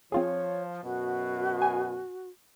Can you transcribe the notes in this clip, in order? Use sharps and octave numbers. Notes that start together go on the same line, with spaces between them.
F3 C4 F4 G#4 C#5
F#2 B2 F#4
G#5